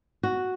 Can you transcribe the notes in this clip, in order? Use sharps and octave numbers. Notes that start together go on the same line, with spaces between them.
F#4